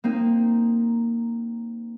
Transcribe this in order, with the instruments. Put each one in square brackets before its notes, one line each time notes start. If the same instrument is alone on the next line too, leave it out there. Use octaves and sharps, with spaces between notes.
[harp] A#3 C4 D#4